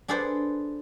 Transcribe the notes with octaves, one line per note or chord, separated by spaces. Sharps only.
D4 G#4 A4 B4 C5 D5